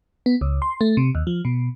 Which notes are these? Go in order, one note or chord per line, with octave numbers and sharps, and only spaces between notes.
B3
C#2
C6
A3
C3
D#2
F3
B2